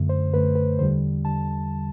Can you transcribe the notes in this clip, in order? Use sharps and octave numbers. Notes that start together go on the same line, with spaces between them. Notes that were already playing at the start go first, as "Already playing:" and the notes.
Already playing: F#2 D3 A3
C5
F#2 D3 A3 B4
B4
E2 D3 G3 C5
D3 G3 A5